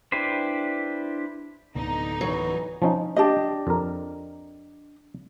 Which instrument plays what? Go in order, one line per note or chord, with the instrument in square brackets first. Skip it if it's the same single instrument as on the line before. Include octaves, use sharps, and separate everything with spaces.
[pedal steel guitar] D4 E4 G4 B4 C5
[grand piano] D1 B3 A#5 [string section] D3 D#4
[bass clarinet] E3 [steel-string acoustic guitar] F#3
[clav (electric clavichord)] F3 C#4 D#4
[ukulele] D4 G4 D#5
[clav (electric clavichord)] F2 A#4